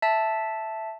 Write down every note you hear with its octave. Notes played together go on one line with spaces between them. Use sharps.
E5 A5